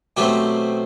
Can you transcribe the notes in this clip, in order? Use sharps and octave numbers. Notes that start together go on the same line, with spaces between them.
B2 F#3 A3 C4 G4 B4